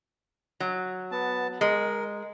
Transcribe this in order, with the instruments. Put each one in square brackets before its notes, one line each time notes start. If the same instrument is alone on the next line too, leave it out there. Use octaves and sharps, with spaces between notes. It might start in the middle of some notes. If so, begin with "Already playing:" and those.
[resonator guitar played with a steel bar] F#3
[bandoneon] B3 A5
[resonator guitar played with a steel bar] G#3 [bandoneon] A#4